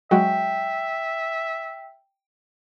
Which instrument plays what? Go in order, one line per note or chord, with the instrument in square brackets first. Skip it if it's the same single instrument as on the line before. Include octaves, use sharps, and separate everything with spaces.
[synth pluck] F#3 G#3 F#4 [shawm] E5 [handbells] G5